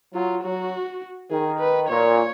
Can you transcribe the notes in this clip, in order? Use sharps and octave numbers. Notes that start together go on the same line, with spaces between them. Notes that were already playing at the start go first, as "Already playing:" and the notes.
F#3 F4
F#3 F#4
D#3 G#4
B4
A#2 C#5